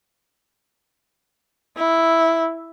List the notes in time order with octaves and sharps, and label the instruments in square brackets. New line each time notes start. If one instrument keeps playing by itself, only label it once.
[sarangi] E4